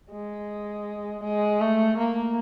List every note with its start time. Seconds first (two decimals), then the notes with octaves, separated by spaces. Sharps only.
0.12 G#3
1.23 G#3
1.61 A3
1.97 A#3